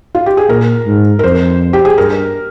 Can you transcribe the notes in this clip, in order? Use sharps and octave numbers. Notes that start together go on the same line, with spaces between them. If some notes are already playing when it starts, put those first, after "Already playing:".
F4
G4
G#4
A#2 A#4
G#2
A#4
F2 C5
G4
G#4
G2 A#4